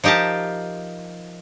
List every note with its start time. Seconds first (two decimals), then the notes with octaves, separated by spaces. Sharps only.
0.04 F3 D#4 G4 A#4 A5